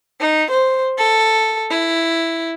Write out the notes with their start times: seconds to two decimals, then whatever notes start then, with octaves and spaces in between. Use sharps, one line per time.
0.20 D#4
0.51 C5
0.98 A4
1.71 E4